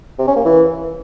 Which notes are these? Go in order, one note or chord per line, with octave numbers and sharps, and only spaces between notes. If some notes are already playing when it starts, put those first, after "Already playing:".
C3
C#4
A#3
E3